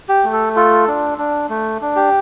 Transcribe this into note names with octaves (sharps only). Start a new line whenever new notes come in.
G4
A3
A4
F4 A4
D4
D4
A3
D4
G4